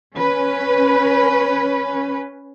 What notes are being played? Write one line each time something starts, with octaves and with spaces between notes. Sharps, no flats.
C#4 B4